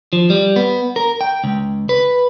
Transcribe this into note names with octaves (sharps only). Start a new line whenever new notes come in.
F3
G3
B3
A#4
G5
C#2
B4